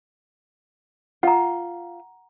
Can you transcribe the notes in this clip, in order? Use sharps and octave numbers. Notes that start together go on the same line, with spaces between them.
F4 F#5 A#5